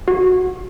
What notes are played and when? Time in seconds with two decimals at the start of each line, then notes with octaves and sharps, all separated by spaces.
0.08 F#4